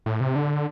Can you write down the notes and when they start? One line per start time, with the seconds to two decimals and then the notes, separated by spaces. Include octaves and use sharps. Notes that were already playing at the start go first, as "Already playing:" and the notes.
0.06 A2
0.21 C3
0.36 D3